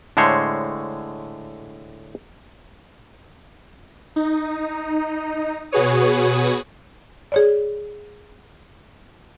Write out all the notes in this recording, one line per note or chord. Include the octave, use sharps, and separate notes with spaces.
A2 D3 G#3 C5 C#5
D#4
B2 F#4 G#4 B4 C#5 D#6
G#4 C#5 D5